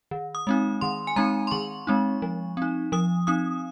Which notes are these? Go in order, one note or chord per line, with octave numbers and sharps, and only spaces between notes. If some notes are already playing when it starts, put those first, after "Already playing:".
D#3
D#6
G#3 C4 D#4
D#3 C6
G#5
G#3 C4 D#4 A#5
C6
D#3 C#6
G#3 C4 D#4
F3
C4 D#4
F3 D#6
C4 D#4 D#6